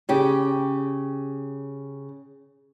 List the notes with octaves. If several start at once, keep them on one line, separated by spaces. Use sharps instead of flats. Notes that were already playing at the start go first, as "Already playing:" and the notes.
C#3 G4